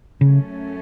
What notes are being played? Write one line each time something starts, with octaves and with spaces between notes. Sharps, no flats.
F#2 C#3 F#3 A3 C#4